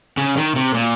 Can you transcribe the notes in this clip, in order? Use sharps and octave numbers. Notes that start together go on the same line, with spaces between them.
C#3
D#3
C3
A#2